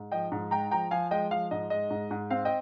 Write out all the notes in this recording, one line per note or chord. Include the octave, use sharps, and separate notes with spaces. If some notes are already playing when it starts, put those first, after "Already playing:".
Already playing: G#2
F3 D#5 G5
G#2
G#3 G5 A#5
F3 G5 A#5
F3 F5 G#5
G#3 D#5 G5
F3 F5
G#2 D#5
G#3 D#5
G#2
G#2
C4 F5
D#5 G5